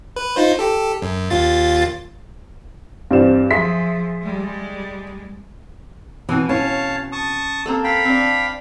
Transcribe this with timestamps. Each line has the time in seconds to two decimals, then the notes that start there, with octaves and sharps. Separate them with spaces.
0.16 B4
0.36 D#4 F4 C5
0.59 G4 A4
1.02 F#2
1.30 D#2 F4 A6
3.11 G2 E3 C4 D5 E7
3.51 F3 G#4 E5 C6 B6
4.22 G3 G#3
6.29 B2 E3 C4 G#5
6.49 C#4 C#5 F5 A5
7.12 A5 C#6 D#6
7.66 A#3 C4 A4
7.84 F5 G5 B5
8.05 C4 D4